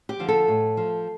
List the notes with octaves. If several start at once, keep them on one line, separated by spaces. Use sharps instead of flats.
G4
D3 F3
A4
A2
F3